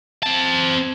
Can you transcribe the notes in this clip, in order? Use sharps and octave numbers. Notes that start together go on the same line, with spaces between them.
C4 A5